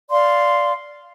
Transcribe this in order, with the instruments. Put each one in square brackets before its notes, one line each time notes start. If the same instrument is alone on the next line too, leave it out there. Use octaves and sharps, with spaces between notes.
[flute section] D5 F5 C6